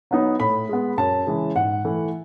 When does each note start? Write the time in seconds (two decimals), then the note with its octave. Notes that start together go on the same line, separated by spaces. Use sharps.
0.11 F#3 B3 D#4
0.40 A2 B5
0.69 G#3 B3
0.98 F#2 A5
1.27 C#3 E3 G#3
1.56 G#2 F#5
1.85 E3 A3